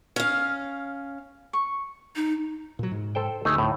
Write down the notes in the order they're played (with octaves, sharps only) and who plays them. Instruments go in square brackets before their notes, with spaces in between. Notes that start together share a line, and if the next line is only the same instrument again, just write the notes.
[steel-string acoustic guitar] C#4 F5
[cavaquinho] C#6
[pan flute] D#4
[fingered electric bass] A#2 F#3
G#2
[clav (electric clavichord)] A4 C5 G5
[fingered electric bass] D2 [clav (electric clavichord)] A3 D#4 G#4
[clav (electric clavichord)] A2